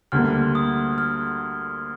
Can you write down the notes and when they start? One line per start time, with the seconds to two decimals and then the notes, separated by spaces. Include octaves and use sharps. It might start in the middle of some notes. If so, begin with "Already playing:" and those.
0.12 D2 D3 G3 A#3 F6
0.55 D#6
0.98 F6